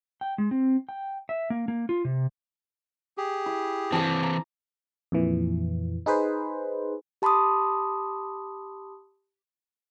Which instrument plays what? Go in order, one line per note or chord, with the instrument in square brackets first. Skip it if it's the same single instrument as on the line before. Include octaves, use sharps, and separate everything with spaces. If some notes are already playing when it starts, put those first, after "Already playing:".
[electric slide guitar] G5
G#3
C4
G5
E5
A#3
A#3
F4
C3
[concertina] G4 G#4
[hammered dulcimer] E4
[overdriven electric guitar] E3 C4 [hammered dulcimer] A5 D6
[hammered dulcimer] A#5
[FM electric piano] F2 A#2 E3
D#4 G#4 B4 C5
[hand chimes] G4 A5 B5 C6 D6 D#6